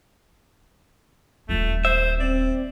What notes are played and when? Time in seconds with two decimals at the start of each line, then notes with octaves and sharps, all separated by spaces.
1.49 D#1 A3 F4
1.85 C5 E5
2.20 C4 D5